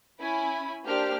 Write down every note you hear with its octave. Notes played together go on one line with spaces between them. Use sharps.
C#4 E4 G#5 B5
A#3 D4 G4 C5 F6